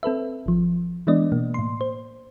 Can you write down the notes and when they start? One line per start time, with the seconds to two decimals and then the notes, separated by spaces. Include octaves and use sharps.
0.03 C4 A4 B4 E5
0.46 G#1 F3
1.07 E3 G#3 B3 D4 D5 D#5
1.32 B2 A#3
1.54 A2 C6
1.81 C5